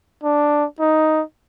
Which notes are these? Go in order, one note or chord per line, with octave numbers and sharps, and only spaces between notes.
D4
D#4